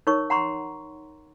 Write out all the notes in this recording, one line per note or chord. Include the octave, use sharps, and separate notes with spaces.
D#4 A#4 C#5 C#6
F#5 A#5 C6 C#6